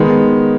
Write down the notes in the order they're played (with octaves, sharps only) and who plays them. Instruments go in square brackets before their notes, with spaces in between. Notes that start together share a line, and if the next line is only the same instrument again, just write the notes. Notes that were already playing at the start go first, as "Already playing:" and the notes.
Already playing: [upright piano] D#3 G#3 B3